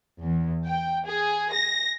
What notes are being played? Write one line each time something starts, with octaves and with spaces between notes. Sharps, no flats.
E2
G5
G#4
A#6